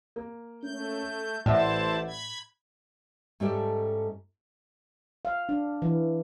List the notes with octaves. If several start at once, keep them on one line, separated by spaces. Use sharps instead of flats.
A#3
A3 C#4 G6
A1 A2 E4 C5 D5 E5 F#5 A5
B5 G#6
G#2 A3 C#4 G4 A4 D5
F5
D4
E3